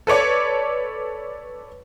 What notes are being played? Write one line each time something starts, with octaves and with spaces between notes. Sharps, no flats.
A4 B4 C#5 D5